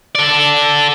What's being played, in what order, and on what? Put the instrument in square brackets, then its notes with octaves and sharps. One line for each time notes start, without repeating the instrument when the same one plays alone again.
[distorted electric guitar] A4 D5